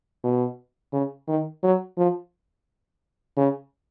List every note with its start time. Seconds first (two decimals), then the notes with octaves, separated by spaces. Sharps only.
0.24 B2
0.93 C#3
1.28 D#3
1.63 F#3
1.97 F3
3.37 C#3